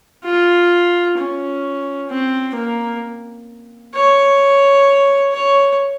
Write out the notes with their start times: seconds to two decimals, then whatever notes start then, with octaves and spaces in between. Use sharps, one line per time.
0.25 F4
1.18 C#4
2.10 C4
2.56 A#3
3.95 C#5
5.33 C#5